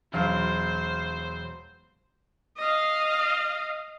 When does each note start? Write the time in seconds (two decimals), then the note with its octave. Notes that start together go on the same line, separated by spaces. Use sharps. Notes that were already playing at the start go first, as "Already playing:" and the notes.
0.13 E1 F#3 C5 F5
2.57 D#5 F5